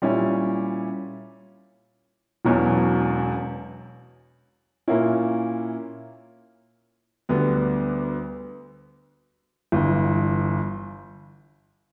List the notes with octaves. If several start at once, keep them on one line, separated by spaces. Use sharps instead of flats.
A#2 G3 C#4 E4
E1 E2 B2 F#3 C#4
A#2 A#3 C#4 E4
D2 D3 G3 B3
G1 G2 E3